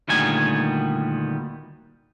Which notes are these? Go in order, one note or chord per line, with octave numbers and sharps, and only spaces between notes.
D2 A#2 D#3 G3 B3 G#5